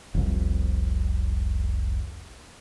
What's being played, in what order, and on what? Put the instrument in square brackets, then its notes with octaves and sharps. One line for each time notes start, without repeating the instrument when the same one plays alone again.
[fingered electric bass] F1 C2